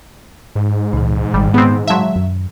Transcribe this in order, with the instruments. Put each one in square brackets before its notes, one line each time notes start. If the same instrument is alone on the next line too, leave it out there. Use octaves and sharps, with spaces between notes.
[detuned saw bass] G#2
[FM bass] C#2 [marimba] A#2 E3
[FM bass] G#1 [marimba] D#3 [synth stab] G3
[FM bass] G#3 [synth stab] B3 C4
[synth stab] F#3 E5 [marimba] F5 A5 C6
[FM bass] F#2